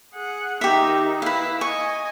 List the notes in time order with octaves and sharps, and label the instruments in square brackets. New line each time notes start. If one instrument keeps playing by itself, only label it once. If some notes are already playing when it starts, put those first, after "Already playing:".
[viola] G#4 F#5
[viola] D#3 D#4 [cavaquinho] G4 E5
[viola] E4 [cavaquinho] B4 F5
[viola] D#5 G#5 [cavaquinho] C#6